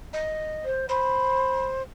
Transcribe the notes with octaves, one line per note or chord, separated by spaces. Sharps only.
D#5
C5
C5 B5